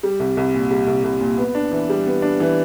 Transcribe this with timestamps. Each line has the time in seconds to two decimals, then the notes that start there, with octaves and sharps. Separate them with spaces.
0.03 G3
0.20 C2
0.37 C2
0.54 A#2
0.71 G3
0.87 C2
1.04 C2
1.21 A#2
1.38 B3
1.55 D4
1.72 E3
1.89 G3
2.06 B3
2.22 D4
2.40 E3